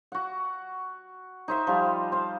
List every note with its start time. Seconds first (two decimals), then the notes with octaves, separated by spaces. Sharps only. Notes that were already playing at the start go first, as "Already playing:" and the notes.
0.12 F#4 F#5
1.48 D#4 C5 E5
1.67 F3 G3 F5
2.12 C5 F5